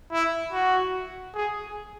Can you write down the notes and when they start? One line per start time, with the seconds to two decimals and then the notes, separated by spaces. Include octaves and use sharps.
0.12 E4
0.52 F#4
1.34 G#4